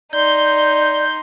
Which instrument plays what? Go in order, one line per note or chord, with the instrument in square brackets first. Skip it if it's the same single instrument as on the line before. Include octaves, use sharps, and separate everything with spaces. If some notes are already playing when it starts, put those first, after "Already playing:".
[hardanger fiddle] D#4 C6 [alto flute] D5 [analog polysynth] G6